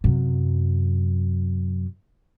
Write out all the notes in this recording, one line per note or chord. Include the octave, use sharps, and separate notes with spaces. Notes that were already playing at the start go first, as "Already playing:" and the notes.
F#2 C3